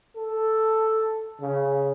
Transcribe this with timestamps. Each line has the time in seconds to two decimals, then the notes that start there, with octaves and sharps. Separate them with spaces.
0.16 A4
1.41 C#3